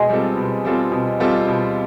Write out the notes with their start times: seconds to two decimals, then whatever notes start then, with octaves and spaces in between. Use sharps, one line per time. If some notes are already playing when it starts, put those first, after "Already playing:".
Already playing: B2 G#3
0.10 G3 C4 F4 A4
0.37 B2
0.65 G3 C4 F4 A4
0.92 B2
1.20 G3 C4 F4 A4
1.48 B2